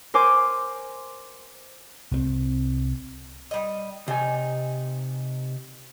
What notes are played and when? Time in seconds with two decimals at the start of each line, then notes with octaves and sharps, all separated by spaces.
0.14 A#4 C5 G#5 D6
2.11 C2 G#3 C4
3.51 G3 D#5
4.08 C3 D#4 G#5